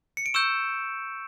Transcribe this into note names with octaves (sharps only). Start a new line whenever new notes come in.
C#7
D7
C#6 E6 G6 E7